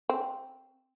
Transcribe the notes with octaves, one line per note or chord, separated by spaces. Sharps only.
C4